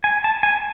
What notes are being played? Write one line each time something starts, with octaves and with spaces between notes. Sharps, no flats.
G#5
A5
G#5